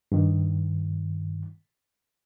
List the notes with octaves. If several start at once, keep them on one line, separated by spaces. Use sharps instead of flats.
G2 D#3